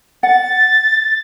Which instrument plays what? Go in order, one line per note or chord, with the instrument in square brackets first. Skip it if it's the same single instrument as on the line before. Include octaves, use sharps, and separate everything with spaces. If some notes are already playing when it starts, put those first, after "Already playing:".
[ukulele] F#5 [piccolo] A6